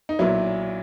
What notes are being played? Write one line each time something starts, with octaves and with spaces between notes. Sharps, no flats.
D#4
B1 A#2 F#3 E4